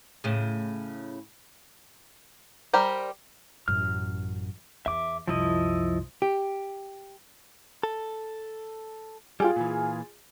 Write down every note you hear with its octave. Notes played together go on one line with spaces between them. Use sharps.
A2 C#3
G3 G4 A#4 C5
A1 F#2 F6
E2 E5 D6
C2 F#2 F3 E4 D#5
G4
A4
G3 F4 G4 G#4
A#2 E3